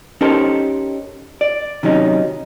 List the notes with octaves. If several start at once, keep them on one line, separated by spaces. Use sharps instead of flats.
C#4 D#4 G4 A4 A#4 C5
D5
C3 D#3 F#3 C#4 D#4